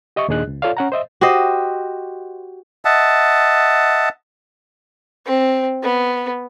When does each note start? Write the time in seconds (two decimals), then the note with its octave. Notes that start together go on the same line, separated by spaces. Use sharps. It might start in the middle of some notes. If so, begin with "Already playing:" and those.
0.16 G4 D#5 E5 C#6
0.28 D#2 A#2 D4 G#4 D#5 F#6
0.47 C#2
0.62 F4 A4 C#5 D5 F5
0.77 C#4 F#5 A#5
0.92 C5 D#5 E5
1.21 F#4 G4 C5 D#5
2.85 D#5 E5 F#5 A5
5.25 C4
5.83 B3